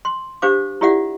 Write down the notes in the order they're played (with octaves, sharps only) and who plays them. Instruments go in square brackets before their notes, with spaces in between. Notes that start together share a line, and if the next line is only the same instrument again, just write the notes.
[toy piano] C6
D4 G4 C5 F5 D6
E4 F4 G4 D5 E5 F#5